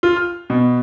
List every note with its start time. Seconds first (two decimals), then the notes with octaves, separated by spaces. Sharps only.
0.03 F4
0.16 F6
0.50 B2